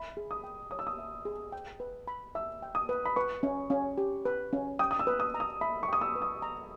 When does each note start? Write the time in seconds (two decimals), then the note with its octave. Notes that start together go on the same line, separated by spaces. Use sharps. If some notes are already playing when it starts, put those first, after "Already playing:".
Already playing: E5 B5
0.17 G#4
0.31 D#6
0.44 G5
0.71 C#5 D#6
0.79 E6
0.87 D#6
0.98 E5
1.25 G#4
1.52 G5
1.80 B4
2.08 B5
2.35 E5 E6
2.62 G5
2.75 D#6
2.89 B4
3.05 B5
3.16 B4 C#6
3.43 C#4
3.70 C#4
3.98 G4
4.25 B4
4.53 C#4
4.79 G5 D#6
4.91 D#6
4.99 E6
5.07 B4
5.20 D#6
5.34 A#5
5.40 D#6
5.61 E5 B5
5.83 C#6
5.88 G5 D#6
6.01 E6
6.15 B4
6.22 D#6
6.42 A#5